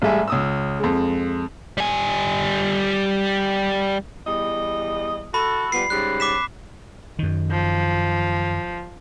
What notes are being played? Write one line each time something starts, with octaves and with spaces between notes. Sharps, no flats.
A1 G3 G#3 E5 G#5
C#2 D#6 E6
F2 G#3
G3 G#5
E2 G3 D#5
F#4 A4 B5
F3 G3 B3 C7
G#2 C#3 G3 F#6
D6 B6 E7
F#2 D#3
F3